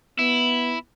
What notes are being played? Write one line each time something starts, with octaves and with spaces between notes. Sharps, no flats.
B3 E4